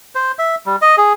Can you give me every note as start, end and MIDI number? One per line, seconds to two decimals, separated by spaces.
0.15 0.32 72
0.39 0.55 76
0.66 0.76 55
0.82 0.96 75
0.98 1.13 68